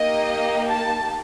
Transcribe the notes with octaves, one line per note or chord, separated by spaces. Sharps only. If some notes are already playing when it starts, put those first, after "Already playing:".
Already playing: A#3 D#4 G4 D#5
A5